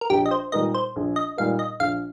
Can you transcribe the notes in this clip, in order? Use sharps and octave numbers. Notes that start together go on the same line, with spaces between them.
A#4
A#1 G4
D#5
C5
A#2 G3 D#4 A#4 D#5
C5
A#1
D#5
A#2 G3 D#4 A#4 F5
D#5
A#1 F5